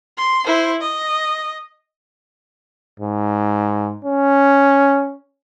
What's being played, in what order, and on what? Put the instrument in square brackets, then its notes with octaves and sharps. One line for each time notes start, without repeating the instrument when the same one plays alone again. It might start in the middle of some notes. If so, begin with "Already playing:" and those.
[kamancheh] C6
E4 C5
D#5
[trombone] G#2
C#4